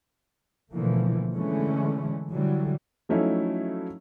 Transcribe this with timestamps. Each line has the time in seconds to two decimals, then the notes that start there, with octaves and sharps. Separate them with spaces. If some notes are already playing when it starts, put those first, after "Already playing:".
0.72 B2 D3 E3 F3 A3 A#3
1.33 D3 E3 G#3 A3 C#4
2.30 D3 E3 F#3 G3
3.09 F3 F#3 A3 C#4 D#4 E4